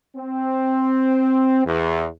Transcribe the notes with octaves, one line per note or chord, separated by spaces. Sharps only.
C4
E2